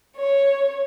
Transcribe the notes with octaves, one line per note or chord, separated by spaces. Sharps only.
C#5